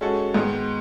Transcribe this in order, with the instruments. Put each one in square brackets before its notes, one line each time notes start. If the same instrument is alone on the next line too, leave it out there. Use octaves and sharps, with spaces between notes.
[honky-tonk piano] G#3 C#4 F#4 A4
G#2 D#3 G#3 B3